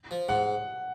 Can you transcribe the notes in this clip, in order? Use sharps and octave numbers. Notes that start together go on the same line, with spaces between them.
F3
G#2 F#5